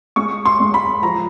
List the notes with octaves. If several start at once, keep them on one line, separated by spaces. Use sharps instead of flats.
G#3 C#6
C6
G#3
B5
F3 A#5